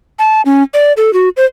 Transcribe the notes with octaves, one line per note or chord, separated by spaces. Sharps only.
A5
C#4
D5
A4
F#4
C5